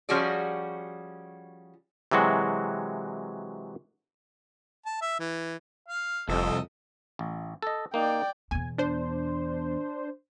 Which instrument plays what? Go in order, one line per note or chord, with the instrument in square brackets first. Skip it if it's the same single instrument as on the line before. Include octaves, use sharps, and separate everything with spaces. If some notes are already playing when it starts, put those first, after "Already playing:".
[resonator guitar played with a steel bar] F3 G3 C#4 F#4 G#4 D5
[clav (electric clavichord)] C3 E3 F#3 G#3 F#4
[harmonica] A5
E5
E3
F5
[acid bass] F1 [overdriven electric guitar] C2 [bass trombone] F2 [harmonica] A4 D#5
[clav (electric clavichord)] A1
A4 D#5
[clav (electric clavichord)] A#3 D#4 [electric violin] D5 G5
[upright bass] E2 B2 [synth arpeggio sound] G#5
[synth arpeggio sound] D4 C5